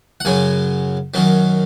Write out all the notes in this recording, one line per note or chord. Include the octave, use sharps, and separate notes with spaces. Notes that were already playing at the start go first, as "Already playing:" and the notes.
F#5
F#2 C#3 F#3 G#5
F#2 D#3 F#3